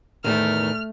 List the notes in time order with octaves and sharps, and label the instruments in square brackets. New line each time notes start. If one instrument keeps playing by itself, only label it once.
[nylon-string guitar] E2 A2 D#3 [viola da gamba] A3 [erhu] F6